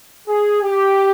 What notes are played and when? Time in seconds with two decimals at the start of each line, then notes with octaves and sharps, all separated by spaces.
0.28 G#4
0.63 G4